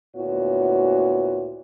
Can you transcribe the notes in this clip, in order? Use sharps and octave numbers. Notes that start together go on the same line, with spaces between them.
D2 A#2 B3 E4 F#4 C#5